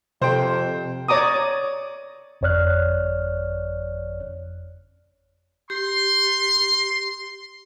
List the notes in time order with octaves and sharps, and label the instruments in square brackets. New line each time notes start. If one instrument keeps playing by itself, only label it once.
[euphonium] F2 [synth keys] C3 G5 [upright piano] C5
[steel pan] C#5 D5 A#5 D6 D#6
[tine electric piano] G1 F2 C#5 D5 F6 F#6
[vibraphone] G4 [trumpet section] C6